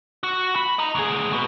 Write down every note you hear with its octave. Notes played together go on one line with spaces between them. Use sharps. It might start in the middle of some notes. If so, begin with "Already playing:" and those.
F#4
B5
D#5 A#5
D2 G#4
F#4 B4